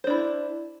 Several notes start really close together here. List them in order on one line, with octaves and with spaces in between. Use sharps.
C5 D4 E4